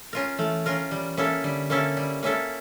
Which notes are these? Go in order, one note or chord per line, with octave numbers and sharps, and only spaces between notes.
C#4 F4 A#4
E3 A3
C#4 F4 A#4
E3 G3
A#3 C#4 E4 A4
D3 G3
A#3 C#4 E4 A4
G3
A#3 C#4 E4 A4